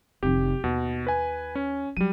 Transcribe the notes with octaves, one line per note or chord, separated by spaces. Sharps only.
F1 D#3 G4
D#2 B2
B4 G#5
C#4
F#3 G3 D#7